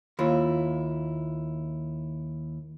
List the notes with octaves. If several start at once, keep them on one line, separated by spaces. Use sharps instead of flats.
D#2 E4 F4